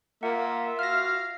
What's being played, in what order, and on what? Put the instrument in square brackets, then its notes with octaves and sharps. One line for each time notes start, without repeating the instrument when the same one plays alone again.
[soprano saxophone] A#3 [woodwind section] F4 E5 [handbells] F#5
[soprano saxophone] F#4 [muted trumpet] F5 [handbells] F6 A#6